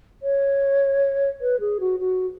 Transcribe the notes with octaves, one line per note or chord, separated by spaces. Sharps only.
C#5
B4
G#4
F#4
F#4